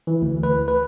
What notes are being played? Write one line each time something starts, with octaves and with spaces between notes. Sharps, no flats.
E3
D2
B4
B4